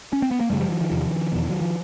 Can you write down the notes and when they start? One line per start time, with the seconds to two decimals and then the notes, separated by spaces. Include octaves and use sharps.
0.13 C#4
0.22 C4
0.31 B3
0.41 A#3
0.50 F#2 C#3 G3 A3
0.60 F3 G3
0.70 E3 F#3
0.81 D#3 F3
0.91 E2 C3
1.32 E2 B2
1.50 F#3
1.62 F3